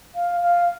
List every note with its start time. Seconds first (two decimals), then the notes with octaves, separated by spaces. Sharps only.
0.15 F5
0.41 F5